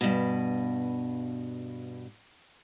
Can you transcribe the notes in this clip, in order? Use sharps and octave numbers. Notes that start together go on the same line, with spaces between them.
G2 B2